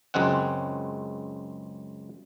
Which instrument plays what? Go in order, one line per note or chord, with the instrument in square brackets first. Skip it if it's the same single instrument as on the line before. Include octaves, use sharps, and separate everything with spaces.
[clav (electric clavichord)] C#2 F#2 G#3 C4 F#5